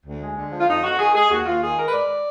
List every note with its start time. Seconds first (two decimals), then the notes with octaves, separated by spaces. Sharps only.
0.05 D2
0.20 G#3
0.36 D3
0.52 F3
0.60 F4
0.67 F2 D#4
0.82 F2 F#4
0.98 D#3 G#4
1.14 G#3 G#4
1.30 D#2 F#4
1.45 D#2 F4
1.61 D#3 G#4
1.77 G#3 A#4
1.88 B4
1.92 G#2 D5